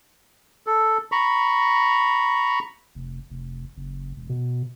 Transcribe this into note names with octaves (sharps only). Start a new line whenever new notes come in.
A4
A#5 B5 C#6
F1
F1
F#1
E1
B2